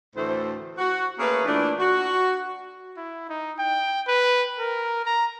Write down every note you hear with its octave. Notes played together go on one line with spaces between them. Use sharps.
D2 A2 E3 A3 C5
F#4
A3 A#3 C#4 G#4 A#4 B4
A#2 E3 A3 D4
F#4
E4
D#4
G5
B4
A#4
A#5